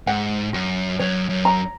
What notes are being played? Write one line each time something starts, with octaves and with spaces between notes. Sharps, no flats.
G#2 F#5
F#2 F#4
F#2 C#5
F#2
A#5